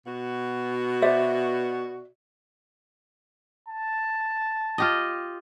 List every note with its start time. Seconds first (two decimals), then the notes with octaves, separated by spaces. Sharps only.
0.07 B2 F#4
1.02 C5 D5 E5
3.68 A5
4.78 F4 G4 D#5